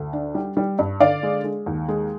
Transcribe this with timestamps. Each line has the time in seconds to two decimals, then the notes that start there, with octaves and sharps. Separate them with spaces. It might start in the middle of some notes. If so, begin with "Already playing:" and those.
Already playing: D2
0.13 D4
0.35 G3
0.57 G3
0.79 G2
1.00 D3 D5 F5
1.23 G#3
1.44 G#3
1.66 D#2
1.88 G#3